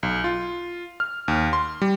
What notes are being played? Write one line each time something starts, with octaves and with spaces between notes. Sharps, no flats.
B1
F4
F6
D#2
C6
G3